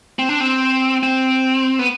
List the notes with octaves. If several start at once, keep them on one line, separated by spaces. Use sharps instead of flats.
C4
D4
C4
C4
B3